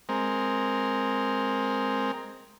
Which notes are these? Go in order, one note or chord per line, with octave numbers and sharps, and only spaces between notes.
G#3 C4 A#4